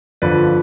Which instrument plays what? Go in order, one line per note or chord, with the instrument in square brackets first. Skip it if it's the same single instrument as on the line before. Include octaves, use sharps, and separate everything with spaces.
[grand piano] G1 F2 D3 F3 B4 D5